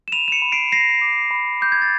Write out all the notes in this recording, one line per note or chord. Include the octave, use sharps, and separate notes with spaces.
E7
B5 D#7 F7
E7
C#7 D#7
B5
C7 D7
B5 A#6 C7
D6
B5
D6 G6
G#6
A6